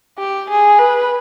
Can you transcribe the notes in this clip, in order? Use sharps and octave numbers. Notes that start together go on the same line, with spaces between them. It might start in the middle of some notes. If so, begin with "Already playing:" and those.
G4
G#4
B4